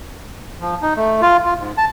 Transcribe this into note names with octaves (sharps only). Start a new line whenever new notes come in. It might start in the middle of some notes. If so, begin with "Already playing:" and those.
F3
D#4
A3
F4
F4
G#2
A5